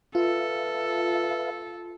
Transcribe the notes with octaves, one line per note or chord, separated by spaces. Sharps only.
F4 A4 B4 E5 F5